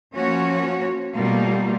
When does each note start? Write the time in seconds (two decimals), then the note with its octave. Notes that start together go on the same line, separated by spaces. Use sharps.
0.15 F3 A#3 C#4 F#4 C#5
1.16 B2 G3 A3 A#3 F4